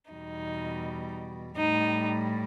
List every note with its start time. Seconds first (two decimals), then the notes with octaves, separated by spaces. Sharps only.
0.12 E2 B2 G3 D#4
1.56 A2 G3 D#4